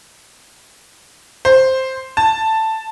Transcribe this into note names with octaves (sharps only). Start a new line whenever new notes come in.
C5
A5